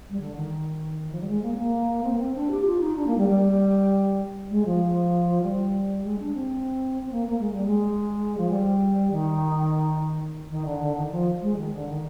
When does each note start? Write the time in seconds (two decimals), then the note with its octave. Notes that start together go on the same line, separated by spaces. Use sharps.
0.09 G3
0.19 D3
0.35 D#3
1.11 F3
1.20 G3
1.27 G#3
1.42 A#3
1.53 C4
1.57 A#3
2.03 C4
2.13 A#3
2.18 C4
2.34 D4
2.50 G4
2.65 F4
2.80 D#4
2.95 D4
3.06 A#3
3.17 G3
3.27 G3
4.50 G#3
4.65 F3
5.41 G3
6.03 G#3
6.18 D4
6.34 C4
7.01 C4
7.11 A#3
7.26 A#3
7.39 G#3
7.52 G3
7.65 G#3
8.37 F3
8.49 G3
9.11 D#3
10.49 D#3
10.65 D3
10.80 D3
10.95 D#3
11.11 F3
11.41 G#3
11.56 D#3
11.71 D3
11.87 D#3